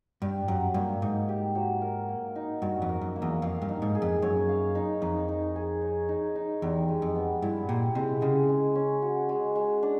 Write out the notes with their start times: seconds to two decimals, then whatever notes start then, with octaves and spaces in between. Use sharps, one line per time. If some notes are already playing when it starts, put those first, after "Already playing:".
0.22 G2 G4
0.48 F#2 F#3
0.74 G2 A#3
1.02 G#2 D#4
1.29 G4
1.55 F#3
1.81 A#4
2.08 A#3
2.36 D#4
2.62 G2 F#4
2.82 F2
2.89 A#4
3.02 F#2
3.16 A#3
3.22 E2
3.42 F2 F5
3.62 G2
3.69 D#4
3.82 G#2
3.95 G#4
4.02 F2
4.22 F#2 C#5
4.49 F5
4.75 D#4
5.02 F2 D#4
5.28 D#4
5.56 G#4
5.81 C#5
6.09 D#4
6.35 D#4
6.62 E2 G4
6.89 G#3
7.02 F2
7.15 B3
7.42 G2 E4
7.69 A#2 G4
7.95 C3 G#3
8.22 C#3 G#3
8.49 G#3
8.75 C#4
9.02 F#4
9.29 G#3
9.55 G#3
9.83 D4